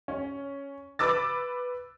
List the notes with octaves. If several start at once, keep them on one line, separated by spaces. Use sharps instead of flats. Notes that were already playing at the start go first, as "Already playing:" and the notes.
C#4
B4 D6 E6 A6